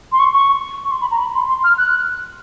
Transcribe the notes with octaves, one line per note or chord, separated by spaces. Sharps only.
C6
C#6
C#6
C#6
C6
B5
A#5
B5
C6
C6
F6
F#6